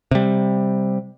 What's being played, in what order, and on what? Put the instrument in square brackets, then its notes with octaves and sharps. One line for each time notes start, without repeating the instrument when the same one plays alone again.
[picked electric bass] C3 G3